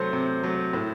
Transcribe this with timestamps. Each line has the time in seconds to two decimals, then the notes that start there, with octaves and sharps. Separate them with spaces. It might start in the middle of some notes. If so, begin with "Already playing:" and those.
Already playing: C3 F#3 A3 C5
0.13 C3
0.43 F#3 A3
0.73 A2